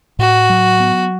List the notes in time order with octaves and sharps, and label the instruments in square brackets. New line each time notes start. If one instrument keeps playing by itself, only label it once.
[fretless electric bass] A2 [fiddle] F#4
[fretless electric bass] F#3
B3